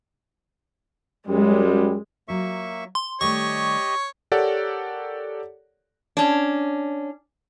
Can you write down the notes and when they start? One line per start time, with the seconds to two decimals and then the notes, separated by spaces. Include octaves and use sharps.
1.28 F#2 G3 G#3
2.28 F#3 A#3 F4 E5 C#6
2.95 C6
3.21 D#3 G3 A3 G4 C#5 D#5 C#6
4.32 G4 A4 A#4 C#5 D5 F#5
6.17 C#4 D4